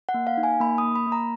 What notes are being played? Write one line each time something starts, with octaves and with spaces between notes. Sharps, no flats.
F#5
A#3
F5
D#4
G#5
A#3 B5
A#3 D#6
B5
A#3
A#5